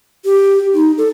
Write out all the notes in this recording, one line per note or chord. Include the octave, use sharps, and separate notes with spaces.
G4
D#4
A4